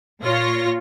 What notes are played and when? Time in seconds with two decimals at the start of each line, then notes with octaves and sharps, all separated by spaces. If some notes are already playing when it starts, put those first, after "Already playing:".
0.22 A#2 F4 C#5 A#6